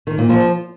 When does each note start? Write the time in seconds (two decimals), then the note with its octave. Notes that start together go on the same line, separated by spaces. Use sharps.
0.07 D#3
0.18 A#2
0.29 F3